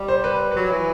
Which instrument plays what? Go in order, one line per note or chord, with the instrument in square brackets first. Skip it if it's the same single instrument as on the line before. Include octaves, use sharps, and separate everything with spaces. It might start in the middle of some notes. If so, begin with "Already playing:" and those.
Already playing: [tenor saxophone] G3
[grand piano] C5
B4
[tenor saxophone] F#3 [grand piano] B4
[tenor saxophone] E3